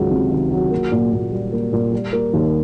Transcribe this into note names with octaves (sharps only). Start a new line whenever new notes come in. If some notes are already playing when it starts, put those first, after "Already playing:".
Already playing: C#2 D#3 F#3
C3
D#3
F#3
A#3
A#2
A#2
G3
A#3
A#2
G3
A#3
D#2